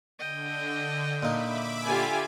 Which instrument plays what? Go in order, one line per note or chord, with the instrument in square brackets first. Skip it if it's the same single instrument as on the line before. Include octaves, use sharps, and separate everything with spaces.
[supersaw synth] D3 [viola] D#5 G5
[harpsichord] A#2 D#4 [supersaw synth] E5 B5 D6
[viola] D3 F4 [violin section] G4 G#5